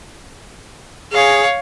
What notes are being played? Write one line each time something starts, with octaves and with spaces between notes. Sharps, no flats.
G#4 C#5 F5